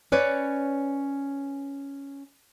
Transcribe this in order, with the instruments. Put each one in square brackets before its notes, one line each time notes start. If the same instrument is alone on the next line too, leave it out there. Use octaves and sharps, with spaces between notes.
[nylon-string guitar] C#4 B4 C#5 D5